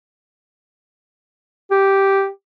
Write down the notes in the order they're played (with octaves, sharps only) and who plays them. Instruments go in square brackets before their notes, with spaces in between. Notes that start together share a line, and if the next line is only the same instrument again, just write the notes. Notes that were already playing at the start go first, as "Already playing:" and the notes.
[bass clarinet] G4